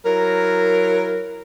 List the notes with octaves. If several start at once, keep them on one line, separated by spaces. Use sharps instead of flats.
F#3 E4 A#4